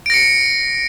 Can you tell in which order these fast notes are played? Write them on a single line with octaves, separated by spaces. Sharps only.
D7 A#6 C#7